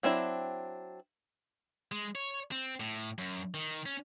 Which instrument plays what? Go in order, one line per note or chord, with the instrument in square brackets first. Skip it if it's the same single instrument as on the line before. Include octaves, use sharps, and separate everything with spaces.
[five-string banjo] F#3 C4 D4 E4
[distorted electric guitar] G#3
C#5
C4
A2
F#2
D#3
C#4